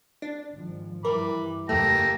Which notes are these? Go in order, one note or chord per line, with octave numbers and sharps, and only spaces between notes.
D4
G#1 F3
G2 E3 A#4 B5 D6
F#1 E2 A3 A#3 G4 A4 A#6